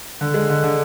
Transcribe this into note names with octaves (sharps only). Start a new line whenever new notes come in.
D3
G#3
D3
D3